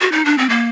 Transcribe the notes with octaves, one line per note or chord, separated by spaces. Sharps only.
F#4
D#4
D4
C4
A#3